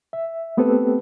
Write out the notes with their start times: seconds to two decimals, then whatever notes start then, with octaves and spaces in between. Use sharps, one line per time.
0.13 E5
0.57 A3 B3 C4 G4 A4 B4